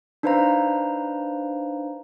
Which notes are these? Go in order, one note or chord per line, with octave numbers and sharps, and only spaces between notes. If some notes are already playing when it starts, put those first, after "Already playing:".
D4 D#4 B4 C5 F5 A#5